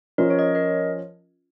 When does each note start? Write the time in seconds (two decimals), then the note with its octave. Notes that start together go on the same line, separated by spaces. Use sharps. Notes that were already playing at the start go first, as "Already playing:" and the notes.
0.18 F3 C#4 F4 A#4 D#5
0.30 C#5
0.39 D#5
0.43 C#5
0.55 A#4 D#5